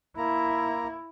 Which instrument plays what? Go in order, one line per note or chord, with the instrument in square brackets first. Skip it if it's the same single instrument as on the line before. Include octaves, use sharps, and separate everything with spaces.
[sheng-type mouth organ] A#3 A#5 [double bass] E4